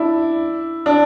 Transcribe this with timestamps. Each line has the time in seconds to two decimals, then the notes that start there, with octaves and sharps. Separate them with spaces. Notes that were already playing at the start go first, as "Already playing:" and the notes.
Already playing: D4 E4
0.86 D4